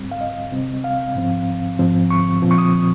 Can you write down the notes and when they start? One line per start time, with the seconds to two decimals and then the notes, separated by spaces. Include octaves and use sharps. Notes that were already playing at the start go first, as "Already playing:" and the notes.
Already playing: G#2 G3 C4
0.11 F5
0.21 D#5
0.52 C3 G3 C4
0.84 F5
1.15 G#2 F3 C4
1.79 G#2 F3 C4
2.10 C#6
2.42 A#2 F3 C4
2.51 C#6
2.58 D#6